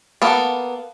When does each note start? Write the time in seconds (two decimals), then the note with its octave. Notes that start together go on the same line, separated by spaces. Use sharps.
0.22 A#3 B3 A4